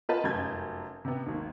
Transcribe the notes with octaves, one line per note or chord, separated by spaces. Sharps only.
F4 A#4 B4 D#5 A5
F1 F#2 A5 G6 G#6
C3 B3
G#1 D#2